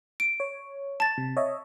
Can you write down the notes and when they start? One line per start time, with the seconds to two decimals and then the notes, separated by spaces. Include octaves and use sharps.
0.20 D7
0.40 C#5
1.00 A5 A6
1.18 C3
1.37 C#5 D#5 E5